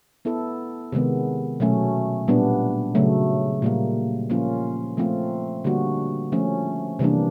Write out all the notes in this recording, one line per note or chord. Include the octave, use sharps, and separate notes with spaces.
B3 E4 A4
C3 D#3 G#3 B3
B2 F#3 A3 C#4
A#2 G3 B3 D4
C#3 F#3 A3
A#2 G3 A#3
F3 A#3 C#4 F4
F3 A3 C4 F4
D3 G3 A#3 D4 F#4
F3 A3 C#4
C3 E3 G3 A#3 D4